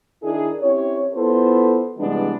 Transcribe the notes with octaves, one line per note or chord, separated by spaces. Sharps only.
D#3 D4 E4 G#4
C4 C#4 E4 G4 C#5
B3 E4 F4 A4 C5
C3 E3 G3 G#3 B3 D4